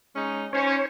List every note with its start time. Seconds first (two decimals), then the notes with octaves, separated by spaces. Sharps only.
0.16 G#3 C#4 D#4
0.53 C#4 D#4 C5 C#5